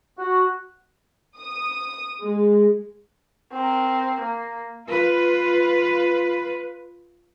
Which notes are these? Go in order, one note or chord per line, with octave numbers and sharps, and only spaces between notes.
F#4
D#6
G#3
C4 A#4
A#3
F4 B4